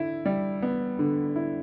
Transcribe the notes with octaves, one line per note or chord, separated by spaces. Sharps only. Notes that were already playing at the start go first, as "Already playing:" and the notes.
Already playing: D3 E4
G3
B3
D3
E4